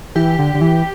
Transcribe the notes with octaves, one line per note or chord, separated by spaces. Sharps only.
E3 G4
D3
D3
E3